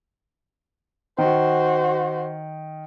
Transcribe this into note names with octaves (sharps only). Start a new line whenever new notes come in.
D#3 F#4 C5